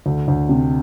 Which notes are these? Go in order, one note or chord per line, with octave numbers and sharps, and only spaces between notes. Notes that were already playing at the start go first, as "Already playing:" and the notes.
D2
D2
C3